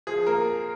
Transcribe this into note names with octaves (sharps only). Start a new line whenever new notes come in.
F3 G#4
A#3 A#4